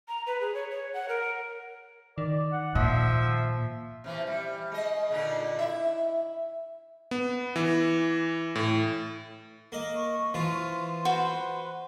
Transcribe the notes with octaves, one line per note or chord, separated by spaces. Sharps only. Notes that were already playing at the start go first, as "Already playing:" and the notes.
A#5
B4
G#4
C#5
C#5
F#5
A#4
D#3 D5
F#5
A#2 F3 E5
C3 E3 F3
G3
G#3 D#5
A#2 D3 D#4
E4 E5
B3
E3
A2
A#3 D#5
C#6
E3 F3 F4 C6
F#4 B4 C5